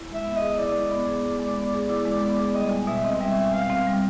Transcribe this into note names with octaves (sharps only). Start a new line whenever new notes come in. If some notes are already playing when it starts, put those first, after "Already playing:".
Already playing: E4
G#3
E5
B3
G#4 D#5
E4 D5
G#3
B3
G#4
E4
G#3
B3
G#4
E4
G#3
B3
G#4
G3 D#5
E2
B2 E5
C4 D#5
G3 E5
E2
B2 F5
C4
G3